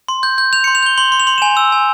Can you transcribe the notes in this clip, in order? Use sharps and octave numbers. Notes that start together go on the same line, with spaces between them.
C6
G6
G6
G6 F7
C#7
C6
F7
G6 G7
C6 G7
C6
F7
C6
E7
G#5 F7
E6
G#5